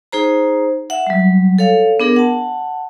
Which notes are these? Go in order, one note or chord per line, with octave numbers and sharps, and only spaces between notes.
D#4 G#4 C5 A#5
E5 F#5
F#3 G3
A4 C#5 F5
B3 D4 G#4 A#4
F#5 A5